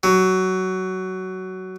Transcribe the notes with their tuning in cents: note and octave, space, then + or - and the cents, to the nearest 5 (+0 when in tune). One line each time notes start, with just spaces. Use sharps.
F#3 +15